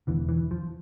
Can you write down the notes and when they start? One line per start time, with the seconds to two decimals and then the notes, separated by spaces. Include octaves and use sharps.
0.07 E1 E2 D3 E3
0.29 E3
0.51 F3